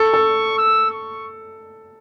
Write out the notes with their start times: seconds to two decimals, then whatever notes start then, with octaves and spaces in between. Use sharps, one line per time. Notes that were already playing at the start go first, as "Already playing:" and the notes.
Already playing: A4 C#6
0.13 A4
0.58 E6
0.91 C#6